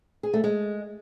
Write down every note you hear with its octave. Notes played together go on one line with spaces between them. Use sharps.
G#4
A3
G#3